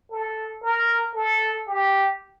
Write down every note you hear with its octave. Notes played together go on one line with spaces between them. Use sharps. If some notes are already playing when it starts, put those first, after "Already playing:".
A4
A#4
A4
G4